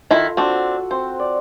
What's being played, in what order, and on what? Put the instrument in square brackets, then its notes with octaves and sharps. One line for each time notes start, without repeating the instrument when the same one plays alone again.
[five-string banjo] D#3 E4 [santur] F4 A4
[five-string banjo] C4 D4 [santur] F#4 E6
[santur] C4 [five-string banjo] C5
[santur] D5